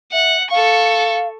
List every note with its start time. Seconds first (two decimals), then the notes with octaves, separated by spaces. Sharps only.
0.13 E5 F#5
0.51 A4 F5 C#6